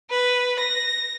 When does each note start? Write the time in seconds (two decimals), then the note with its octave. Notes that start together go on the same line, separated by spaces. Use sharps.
0.10 B4
0.59 A#6